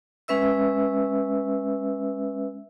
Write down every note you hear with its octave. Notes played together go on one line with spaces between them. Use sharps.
G#3 C#4 B4 E5 E6